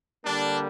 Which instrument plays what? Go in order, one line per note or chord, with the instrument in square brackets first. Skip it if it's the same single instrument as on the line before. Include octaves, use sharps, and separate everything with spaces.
[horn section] D3 G3 A#3 D4